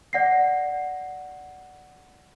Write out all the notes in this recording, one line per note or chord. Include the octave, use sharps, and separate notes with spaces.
D5 F#5 A#6 C7